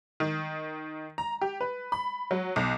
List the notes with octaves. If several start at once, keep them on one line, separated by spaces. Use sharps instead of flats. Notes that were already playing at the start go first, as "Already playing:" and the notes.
D#3
A#5
G4
B4
B5
F#3
B1